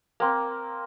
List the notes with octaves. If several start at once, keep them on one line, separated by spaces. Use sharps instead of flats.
A#3 C4